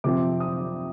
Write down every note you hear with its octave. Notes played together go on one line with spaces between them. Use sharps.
C3 F3 C4 D6
D#6